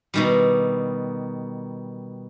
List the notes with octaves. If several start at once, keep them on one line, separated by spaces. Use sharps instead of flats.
B2 D#3 G3